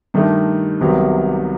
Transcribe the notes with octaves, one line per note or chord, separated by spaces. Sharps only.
G2 D#3 A3 D#4
C2 C3 D#3 F#3 B3